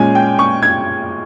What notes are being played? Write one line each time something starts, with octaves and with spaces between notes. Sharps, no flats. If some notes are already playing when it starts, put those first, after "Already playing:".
Already playing: A#2 G#3 C#4 G#5
G5
C#6
G#6